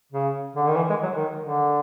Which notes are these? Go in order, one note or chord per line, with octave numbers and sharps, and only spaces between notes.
C#3
D3
D#3
E3
G#3
F#3
D#3
D3